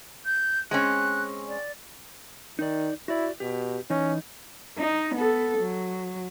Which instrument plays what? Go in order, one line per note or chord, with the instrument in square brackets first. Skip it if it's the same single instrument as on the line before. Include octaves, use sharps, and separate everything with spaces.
[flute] G6
[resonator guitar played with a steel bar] G#3 C4 C#4 [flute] F#6
[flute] D5
[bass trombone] D#3 [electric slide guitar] D#4 D5
[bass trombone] E4 [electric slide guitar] F#4 D5
[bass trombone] B2 [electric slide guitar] G4
[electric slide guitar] E3 D#4 D#5 [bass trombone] C#4
[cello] D#4
B3 A4
F#3